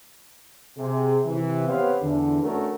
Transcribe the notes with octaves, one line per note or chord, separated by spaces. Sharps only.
C3 G#4
C3 E3
B3 C4 G4 B4 C#5 F5
E2 D3
A3 C#4 D4 F#4 A#4